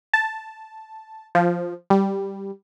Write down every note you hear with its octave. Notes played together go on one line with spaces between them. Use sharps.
A5
F3
G3